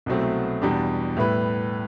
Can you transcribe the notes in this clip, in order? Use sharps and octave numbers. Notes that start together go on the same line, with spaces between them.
C2 B2 F#3 A3 C4
E2 B2 G3 D4 G4
A2 G3 B3 E4 B4